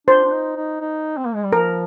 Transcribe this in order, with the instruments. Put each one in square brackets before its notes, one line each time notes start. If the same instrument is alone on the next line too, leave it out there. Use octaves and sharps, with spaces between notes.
[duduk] D4 [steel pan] C5
[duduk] D4
D#4
D#4
D#4
C4
A#3
G#3
G3
[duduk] F3 [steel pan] A#4